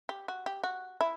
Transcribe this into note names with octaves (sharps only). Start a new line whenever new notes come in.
G4
F#4
G4
F#4
E4